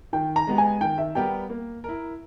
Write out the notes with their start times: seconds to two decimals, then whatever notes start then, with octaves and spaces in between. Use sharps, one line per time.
0.13 D#3 G5
0.36 A#5
0.47 G#3 B3 G4
0.58 G#5
0.81 D#3 G5
0.98 E5
1.15 G3 B3 G4 A#4 G5
1.50 A#3
1.84 E4 A#4